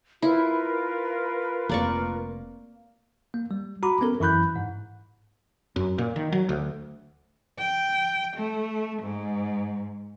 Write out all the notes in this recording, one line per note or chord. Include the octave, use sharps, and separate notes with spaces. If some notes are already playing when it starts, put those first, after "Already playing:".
E4 F4 A#4 B4
F1 A#3 D5 C#6
A#3
G3
F#4 A#5 B5 D6
B3 C#4 A4 A#4
F#2 E3 E4 B5 F#6 G6
G#2
F#2
A#2
D#3
F#3
D2
G5
A3
G#2